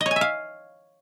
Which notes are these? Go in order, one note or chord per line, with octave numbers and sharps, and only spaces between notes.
D#5
C#5
G#5
E5
F5